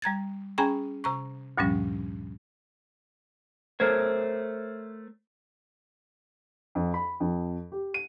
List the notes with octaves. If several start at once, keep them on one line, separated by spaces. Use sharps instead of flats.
G3 A#5 G#6 A6
C#4 G#4 G5 G#5 A#5 B5
C3 A#5 C#6
D2 G2 A#2 F3 G3 C#4
A3 A#4 C5 C#5
F2
B5
F2
G4
D#7